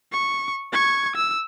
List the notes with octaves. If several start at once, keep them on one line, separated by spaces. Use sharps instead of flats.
C#6
C#6 G#6
E6